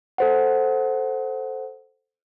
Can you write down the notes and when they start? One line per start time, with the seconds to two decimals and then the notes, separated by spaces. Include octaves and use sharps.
0.18 A4 C5 F#5